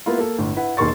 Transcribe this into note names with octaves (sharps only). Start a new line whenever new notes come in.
A#3 B3 E4 F4
A#3 A4
G1 A2
E4 B4 F#5
E1 D#3 A#3 C6 C#6 A6